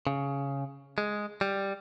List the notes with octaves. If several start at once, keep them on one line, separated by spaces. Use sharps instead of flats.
C#3
G#3
G3